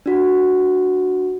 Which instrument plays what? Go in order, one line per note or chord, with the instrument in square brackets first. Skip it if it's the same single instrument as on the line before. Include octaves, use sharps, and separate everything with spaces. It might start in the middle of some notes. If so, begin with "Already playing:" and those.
[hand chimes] D4 F#4